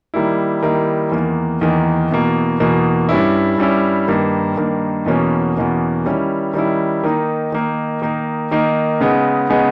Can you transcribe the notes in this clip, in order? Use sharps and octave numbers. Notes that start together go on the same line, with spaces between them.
D#3 G3 A#3 E4
D#3 G3 A#3 E4
E2 D#3 A#3
E2 D#3 A#3
E2 B2 A#3
E2 B2 A#3
G2 G3 C#4 E4
G2 G3 C#4 E4
G2 D#3 A#3
G2 D#3 A#3
E2 B2 A#3 C#4
E2 B2 A#3 C#4
D#3 G3 C#4 E4
D#3 G3 C#4 E4
D#3 A#3 D#4
D#3 A#3 D#4
D#3 A#3 D#4
D#3 A#3 D#4
C#3 G#3 B3 D#4
C#3 G#3 B3 D#4